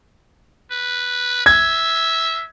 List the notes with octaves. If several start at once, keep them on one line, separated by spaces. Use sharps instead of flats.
B4
E5 G#6